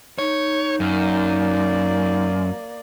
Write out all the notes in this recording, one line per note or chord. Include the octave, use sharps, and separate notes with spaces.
D#4 C#5
F#2 A#3 D5